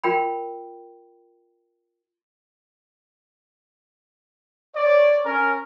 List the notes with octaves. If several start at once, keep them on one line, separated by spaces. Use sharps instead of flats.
F4 A#4 G5 B5
C#5 D5
C#4 A#4